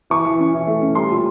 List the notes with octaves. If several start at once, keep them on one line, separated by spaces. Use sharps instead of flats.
E3 C#6
E3
C#4
E3
A3
C#4
G3 C6
A#2